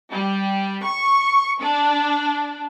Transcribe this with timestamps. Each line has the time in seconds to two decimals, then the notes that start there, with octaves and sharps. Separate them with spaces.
0.11 G3
0.83 C#6
1.61 D4